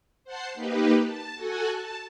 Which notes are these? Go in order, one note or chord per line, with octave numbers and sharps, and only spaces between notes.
C5 F#5 A5 C7
A#3 D#4 G4 B4
A5
F#4 A4 F#5 G#5
A5